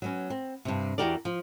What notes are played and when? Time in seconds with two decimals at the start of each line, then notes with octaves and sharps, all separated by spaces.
0.02 F#3 B3 C#4
0.30 C4
0.65 G2 C3
0.98 E2 E3 F#4 G4 A#4 D5
1.25 F3